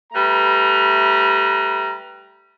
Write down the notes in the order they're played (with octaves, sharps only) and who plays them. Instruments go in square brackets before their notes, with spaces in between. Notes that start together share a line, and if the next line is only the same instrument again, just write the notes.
[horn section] G3 A3 B4 A#5